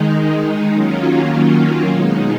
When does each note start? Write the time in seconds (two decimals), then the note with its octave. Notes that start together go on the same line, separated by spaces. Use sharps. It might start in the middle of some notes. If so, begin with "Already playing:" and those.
Already playing: D#3 G#3 D#4
0.71 D#3 F#3 A#3 C#4 F4
1.88 B2 G#3 D#4